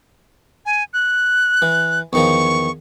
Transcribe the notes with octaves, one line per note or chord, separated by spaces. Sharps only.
G#5
F#6
E3
E2 D#3 F3 C#6